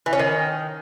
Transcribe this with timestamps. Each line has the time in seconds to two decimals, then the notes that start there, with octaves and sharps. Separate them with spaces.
0.06 E3
0.13 C#4
0.19 D#3